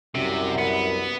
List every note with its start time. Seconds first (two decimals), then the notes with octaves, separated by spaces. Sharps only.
0.15 C2 F#2 C3
0.59 B3